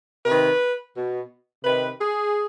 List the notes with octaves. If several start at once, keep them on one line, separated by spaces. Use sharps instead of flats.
C3 D#3 B4
B2
C3 D#3 B4
G#4